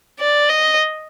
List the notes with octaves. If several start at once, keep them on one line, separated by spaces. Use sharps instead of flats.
D5
D#5